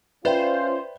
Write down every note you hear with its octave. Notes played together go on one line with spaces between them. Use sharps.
C#4 F4 B4 C5 D5 E5 G5